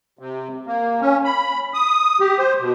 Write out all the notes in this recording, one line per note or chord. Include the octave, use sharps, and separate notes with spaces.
C3
A#3
C#4
B5
D#6
G4
C5
B2